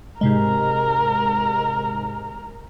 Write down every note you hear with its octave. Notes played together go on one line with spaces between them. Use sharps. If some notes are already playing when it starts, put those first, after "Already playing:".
G#2 C3 G#3 A#4